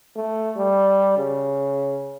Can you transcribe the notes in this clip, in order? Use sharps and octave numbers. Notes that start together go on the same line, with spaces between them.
A3
G3
C#3